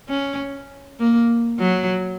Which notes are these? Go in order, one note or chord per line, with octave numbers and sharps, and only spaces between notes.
C#4
A#3
F#3